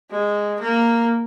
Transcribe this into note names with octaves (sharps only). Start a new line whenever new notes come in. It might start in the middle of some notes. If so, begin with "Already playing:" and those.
G#3
A#3